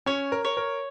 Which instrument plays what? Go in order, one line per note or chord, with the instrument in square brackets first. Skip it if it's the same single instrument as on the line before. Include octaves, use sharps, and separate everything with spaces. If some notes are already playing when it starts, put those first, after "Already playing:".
[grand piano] C#4 [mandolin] C#5
[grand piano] A#4
[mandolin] C#5
[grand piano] A#4